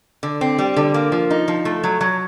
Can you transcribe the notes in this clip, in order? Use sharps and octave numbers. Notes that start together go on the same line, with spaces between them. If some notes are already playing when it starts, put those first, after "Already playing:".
D3
C4
G3
D3
A#3
F3
D#4
F3
A3
F#3
F#3